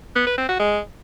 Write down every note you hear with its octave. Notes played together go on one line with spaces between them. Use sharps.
B3
B4
C4
F#4
G#3